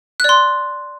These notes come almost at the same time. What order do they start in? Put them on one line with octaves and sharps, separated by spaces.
F#6 D5 C6